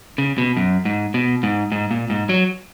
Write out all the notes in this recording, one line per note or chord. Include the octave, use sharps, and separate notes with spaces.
C#3
B2
F#2
G#2
B2
G#2
G#2
A#2
G#2
F#3